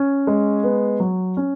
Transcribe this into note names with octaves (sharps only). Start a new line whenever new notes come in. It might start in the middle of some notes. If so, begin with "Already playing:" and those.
Already playing: C#4
G#3
B3
F#3
C#4